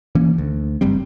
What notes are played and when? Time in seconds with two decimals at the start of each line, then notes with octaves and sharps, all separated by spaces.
0.15 E3 A#3 C#4
0.38 D2
0.81 F#1 G2 G3 C4